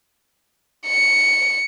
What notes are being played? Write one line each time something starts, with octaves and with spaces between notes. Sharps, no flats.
C#7